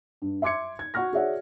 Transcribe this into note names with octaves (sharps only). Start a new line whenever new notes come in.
G2
E5 C6 D6 G#6 C#7
G#6
F#4 F#5 C#6 F6 A#6
F#4 G#4 C#5 D5 E5 F#5